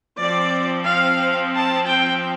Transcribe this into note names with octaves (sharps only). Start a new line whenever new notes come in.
F3 C4 D5
F5
A5
G5